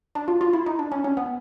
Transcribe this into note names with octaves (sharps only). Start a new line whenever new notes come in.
D4
F4
F4
E4
D#4
D4
C#4
C#4
B3